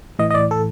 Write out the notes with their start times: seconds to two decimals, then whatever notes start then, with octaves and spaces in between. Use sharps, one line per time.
0.19 A2 E3 D#5
0.30 D#5
0.34 D5
0.51 A4